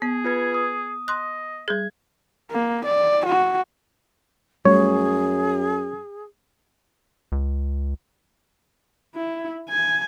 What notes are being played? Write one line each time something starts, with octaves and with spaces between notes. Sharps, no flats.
B3 G#4
F4 B4 G#6
D#6
D#5 C6 F#6
G3 G#4 G#6
A#3
D5
F#4
F#2 G3 A3 G#4 C#5
C#2
E4
G#5